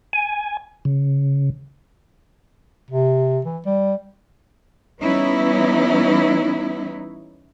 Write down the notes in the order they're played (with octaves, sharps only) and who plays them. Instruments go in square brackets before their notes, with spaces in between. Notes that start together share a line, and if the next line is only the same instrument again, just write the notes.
[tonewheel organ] G#5
C#3
[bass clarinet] C3
E3
G3
[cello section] E3 G3 B3 C#4 D#4 E4